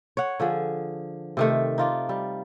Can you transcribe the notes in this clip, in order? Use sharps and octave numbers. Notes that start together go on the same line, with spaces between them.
C#5 F#5
D3 F3 G#4
C3 D#3 A3
D#4 F4 D5
G3